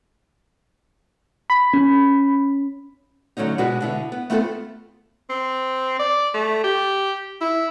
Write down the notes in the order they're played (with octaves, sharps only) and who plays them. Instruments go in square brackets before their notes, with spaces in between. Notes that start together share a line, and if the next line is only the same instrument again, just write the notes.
[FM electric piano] B5
[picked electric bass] C#4
[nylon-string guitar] D3 F#3 A3 C#4 D#4
B2 G#3 D4 F#4 B4
B2 D3 E4
B3
A3 B3 C4 F4 F#4 A4
[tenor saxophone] C4
D5
A3
G4
E4